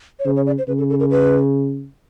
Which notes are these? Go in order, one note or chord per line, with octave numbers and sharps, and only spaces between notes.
C#5
C#3 C5
C#5
D5
C5
C#3 B4
A4
A4
A#4
B4